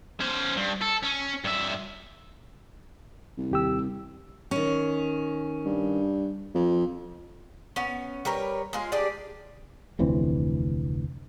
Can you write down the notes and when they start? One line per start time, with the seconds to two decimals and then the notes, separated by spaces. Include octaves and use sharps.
0.20 C#4 C5
0.56 G2
0.82 A4
1.04 C#4
1.45 G2 E5
3.37 C2
3.51 D#2 G4 E6
4.51 D#3 C#4
5.65 G2
6.55 F2
7.76 B3 C#4
8.25 G3 A#4 B4 C#5
8.73 G#3 F4 G#4
8.92 D4 G4 G#4 D5
9.99 F1 D2 E3 C4